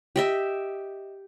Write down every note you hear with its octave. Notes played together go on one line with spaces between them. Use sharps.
G4 D#5 E5